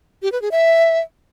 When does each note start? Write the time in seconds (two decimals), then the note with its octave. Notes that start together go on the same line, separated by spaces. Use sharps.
0.22 G4
0.32 B4
0.42 G#4
0.51 E5